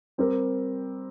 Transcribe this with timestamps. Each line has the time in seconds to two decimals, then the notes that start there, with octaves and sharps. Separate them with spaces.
0.18 G3 C4 G4 A#4